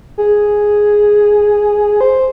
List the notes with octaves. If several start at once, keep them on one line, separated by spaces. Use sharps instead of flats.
G#4
C5